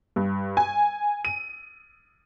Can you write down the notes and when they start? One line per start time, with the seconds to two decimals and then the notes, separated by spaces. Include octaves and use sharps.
0.16 G2
0.57 G#5
1.25 D#7